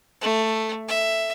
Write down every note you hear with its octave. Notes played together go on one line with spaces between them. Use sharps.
A3
E5